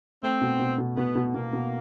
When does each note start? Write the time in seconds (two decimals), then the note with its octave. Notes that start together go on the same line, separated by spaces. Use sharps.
0.23 A3 C4
0.41 B2
0.59 B2
0.78 B2
0.97 B2 B3
1.15 B2
1.34 B2 A#3
1.53 B2